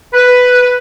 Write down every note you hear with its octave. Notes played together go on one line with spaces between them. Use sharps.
B4